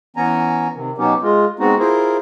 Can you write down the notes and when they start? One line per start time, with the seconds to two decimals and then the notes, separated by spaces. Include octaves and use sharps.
0.16 E3 B3 C#4 G#5 A#5
0.75 C3 D#3
0.98 B2 F#3 B3 C#4 D#4 G4
1.23 G#3 F4
1.59 G#3 B3 C4 D#4 F#4
1.79 E4 F4 G#4 A#4 C5